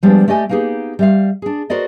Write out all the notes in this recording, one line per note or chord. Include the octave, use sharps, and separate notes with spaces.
F3 G3 G#3 B3 D4
A3 G4 D5 D#5 G#5
A#3 B3 D#4 G4 G#4
G3 E5 F5
D4 G#4
F#4 A#4 C5 D5 D#5